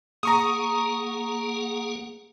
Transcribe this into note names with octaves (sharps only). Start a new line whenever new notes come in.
A#3 G#4 F#5 A#5 C#6 D#6